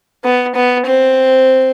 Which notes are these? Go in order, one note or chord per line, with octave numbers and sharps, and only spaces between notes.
B3
B3
C4